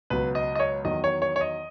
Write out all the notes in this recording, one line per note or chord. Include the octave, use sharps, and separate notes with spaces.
C#2 B2 F#3 B4
D#5
D#5
C#5
E2 D#3 F#3 D#5
C#5
C#5
C#5
D#5